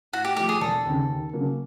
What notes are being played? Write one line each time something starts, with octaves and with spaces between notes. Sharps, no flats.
A2 F#4
G4
F3 A3 G4
G#4
E1 A4
D#2 C#3
D#2
C#3 F#3 A#3